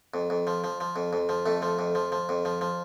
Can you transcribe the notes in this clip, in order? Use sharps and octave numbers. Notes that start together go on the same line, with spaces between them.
F2
F2
F3
F3
F3
F2
F2
F3
F2 A3
F3
F2
F3
F3
F2
F3
F3